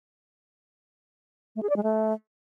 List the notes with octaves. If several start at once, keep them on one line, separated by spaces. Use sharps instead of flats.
A3
G#4
D5
G#3
A3